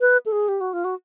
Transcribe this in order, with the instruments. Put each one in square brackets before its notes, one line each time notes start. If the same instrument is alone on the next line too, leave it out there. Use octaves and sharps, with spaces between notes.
[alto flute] B4
A4
G#4
G4
F#4
F4
F#4